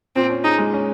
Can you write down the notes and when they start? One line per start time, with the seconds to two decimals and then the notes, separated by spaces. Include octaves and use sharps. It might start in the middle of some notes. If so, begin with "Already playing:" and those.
0.16 A#2 C4
0.30 C#4
0.44 D#4 G#4
0.58 G#3
0.73 C#4